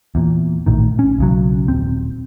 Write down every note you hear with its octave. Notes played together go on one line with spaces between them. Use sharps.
E2 A#2
A#1 A2 D#3
C#4
B1 C#3 F#3
D#1 C4